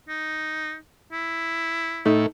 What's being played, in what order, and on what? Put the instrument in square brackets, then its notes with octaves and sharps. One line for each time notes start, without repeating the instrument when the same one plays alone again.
[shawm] D#4
E4
[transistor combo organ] A2 [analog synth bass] A3 [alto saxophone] D#4